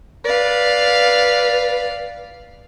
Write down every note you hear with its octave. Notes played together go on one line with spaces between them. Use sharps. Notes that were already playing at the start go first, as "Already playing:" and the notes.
B4 D5 F5